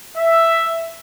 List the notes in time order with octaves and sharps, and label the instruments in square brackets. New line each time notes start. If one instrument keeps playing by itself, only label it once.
[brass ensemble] E5